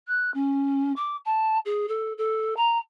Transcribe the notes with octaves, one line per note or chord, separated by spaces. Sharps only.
F#6
C#4
D6
A5
G#4
A4
A4
A#5